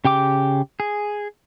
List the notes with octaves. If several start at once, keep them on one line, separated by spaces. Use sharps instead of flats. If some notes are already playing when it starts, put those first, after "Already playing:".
C#3 G4 G5 D6
G#4